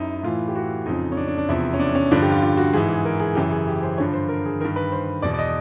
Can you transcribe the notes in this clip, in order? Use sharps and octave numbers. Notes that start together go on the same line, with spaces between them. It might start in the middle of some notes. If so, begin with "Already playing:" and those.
Already playing: F#2 D#4 E4
A2 E3 F4
G4
F#4
F2 C#3 F3 D#4
C#4
D4
D4
D4
E2 C3 F3 E4
C#4
D4
C#4
G2 D3 F3 D4
G4
F4
F4
F#4
G#2 E3 G#4
G#4
A#4
G#4
F#2 C#3 E3 G4
G#4
G4
C5
G2 D3 F3 C#5
C5
A#4
G#4
G2 D#3 A#4
B4
C5
E2 B2 D5
D5
D#5